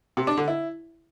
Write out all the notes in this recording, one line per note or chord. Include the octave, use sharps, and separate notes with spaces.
C3
D4
D3
E4